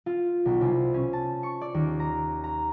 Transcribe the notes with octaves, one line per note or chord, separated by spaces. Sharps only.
F4
B1
C2
C#4
A5
C#6
D5
D#2
A#5
A#5